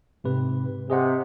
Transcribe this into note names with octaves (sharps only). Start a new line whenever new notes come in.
G#2 C3 B4
C3 G#4 D#5 F#5